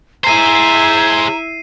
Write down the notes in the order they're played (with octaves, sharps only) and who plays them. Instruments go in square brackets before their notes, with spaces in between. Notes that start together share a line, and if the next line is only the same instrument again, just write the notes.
[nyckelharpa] E4 E5 [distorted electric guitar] G#4 C5 [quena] A#5 [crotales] C7 D#7